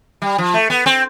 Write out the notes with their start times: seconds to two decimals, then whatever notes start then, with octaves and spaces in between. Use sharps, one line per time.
0.22 G3
0.38 F3
0.54 A3
0.70 B3
0.86 C4